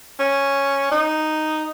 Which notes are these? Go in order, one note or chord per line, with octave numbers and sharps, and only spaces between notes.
C#4
D#4